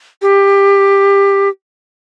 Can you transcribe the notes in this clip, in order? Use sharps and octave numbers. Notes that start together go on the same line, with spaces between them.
G4